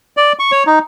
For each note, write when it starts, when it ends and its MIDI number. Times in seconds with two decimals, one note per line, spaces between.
0.17 0.33 74
0.39 0.51 85
0.52 0.63 73
0.67 0.79 63